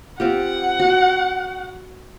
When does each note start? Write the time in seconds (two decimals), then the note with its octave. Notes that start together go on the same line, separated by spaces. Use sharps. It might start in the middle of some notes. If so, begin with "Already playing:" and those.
0.20 C4 F4 G4 F#5
0.79 F#4